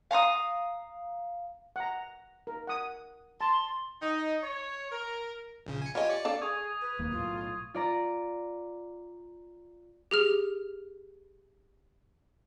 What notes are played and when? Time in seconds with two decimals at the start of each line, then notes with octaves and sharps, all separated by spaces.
0.11 F5 A#5 C6 D#6
1.76 F#5 A#5
2.47 A#4
2.67 F#5 D#6
3.41 A5 C6
4.01 D#4
4.43 C#5
4.92 A#4
5.66 A#1 C#3
5.82 G#5 C#7
5.95 F4 G4 C#5 D#5 G#5
6.09 D5 C#7
6.25 D4 A4 F5
6.41 G#4 C#6 D#6 G#6
6.81 B4
6.99 F1 D#2 A#3
7.12 B1 A2 F4
7.74 F4 D5 A#5
10.11 G4 G#4 F6